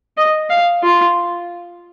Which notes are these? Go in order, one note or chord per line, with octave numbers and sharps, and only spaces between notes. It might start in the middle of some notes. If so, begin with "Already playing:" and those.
D#5
F5
F4